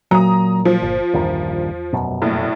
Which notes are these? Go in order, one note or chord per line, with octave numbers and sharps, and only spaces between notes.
A#2 F#3 A#5 D#6
F3 F#3
G1
A#1 E2 G2 D#3
F1 F#2 B2
A#1 A2